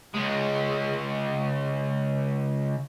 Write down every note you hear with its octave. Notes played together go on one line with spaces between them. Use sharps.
C#2 G#3